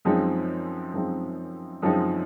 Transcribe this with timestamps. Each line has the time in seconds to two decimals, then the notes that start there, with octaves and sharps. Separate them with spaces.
0.05 F#2 F3 G#3 C4 D#4
0.94 F#2 F3 G#3 C4 D#4
1.82 F#2 F3 G#3 C4 D#4